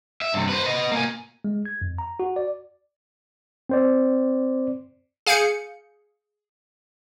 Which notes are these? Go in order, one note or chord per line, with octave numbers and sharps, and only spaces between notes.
E5
G2 C3
B4 C5
B4 D#5
A#3 G#5
G#3
G#6
F2
A#5
F#4
D5
C4 C5 D5
G#4 F5 G#5 G6 C#7